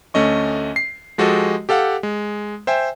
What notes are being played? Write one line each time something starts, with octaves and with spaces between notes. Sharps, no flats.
D2 A3 C#4 D#5 C#6
C7
F3 G#3 F#4 G4 A4 D#5
G4 A4 F5 F#5
G#3
C5 E5 G5 G#5